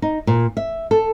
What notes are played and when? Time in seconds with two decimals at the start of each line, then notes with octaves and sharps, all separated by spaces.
0.02 D#4
0.27 A#2
0.57 E5
0.91 A4